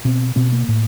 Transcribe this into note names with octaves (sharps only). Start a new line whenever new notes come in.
B2 C4
B2 C4
A#3
A2